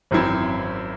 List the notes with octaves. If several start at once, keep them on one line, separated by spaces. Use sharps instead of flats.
G#1 F#2 E3 C4 E4